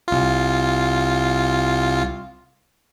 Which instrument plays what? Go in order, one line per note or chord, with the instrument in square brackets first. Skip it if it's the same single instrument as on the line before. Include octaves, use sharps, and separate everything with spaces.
[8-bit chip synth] C2 F4